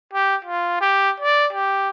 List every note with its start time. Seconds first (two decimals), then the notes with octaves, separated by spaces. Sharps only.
0.14 G4
0.45 F4
0.81 G4
1.21 D5
1.53 G4